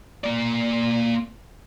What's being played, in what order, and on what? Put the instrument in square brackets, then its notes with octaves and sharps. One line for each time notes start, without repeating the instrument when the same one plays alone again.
[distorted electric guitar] A#3 D5